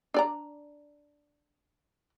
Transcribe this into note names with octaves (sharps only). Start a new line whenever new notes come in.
D4 D5 A#5